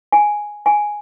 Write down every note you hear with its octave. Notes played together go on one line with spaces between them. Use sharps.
G#5
G#5